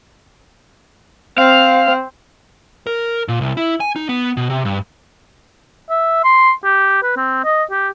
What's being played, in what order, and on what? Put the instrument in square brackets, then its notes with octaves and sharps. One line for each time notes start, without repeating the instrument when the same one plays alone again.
[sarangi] C4 [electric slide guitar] F5
[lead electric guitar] A#4
A#2
C2
E4
G#5
D#4
B3
B2
C3
G2
[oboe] E5
C6
G4
B4
C4
D#5
G4